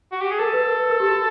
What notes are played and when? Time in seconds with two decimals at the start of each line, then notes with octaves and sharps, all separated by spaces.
0.12 F#4
0.21 G4
0.31 G#4
0.39 A4 A#4
0.53 B4
0.66 A#4
0.80 B4
0.90 A#4
1.00 G4
1.10 F#4